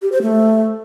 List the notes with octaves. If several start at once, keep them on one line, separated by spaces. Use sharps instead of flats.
G4
C5
A3